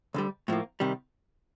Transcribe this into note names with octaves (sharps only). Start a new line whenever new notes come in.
D2 D3 G3
A2 F3 A#3
C3 D#3 G3